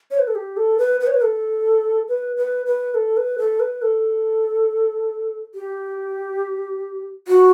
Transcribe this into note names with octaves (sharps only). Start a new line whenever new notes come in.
C#5
B4
A4
G4
A4
B4
B4
C#5
B4
A4
B4
B4
B4
A4
B4
A4
B4
A4
G4
F#4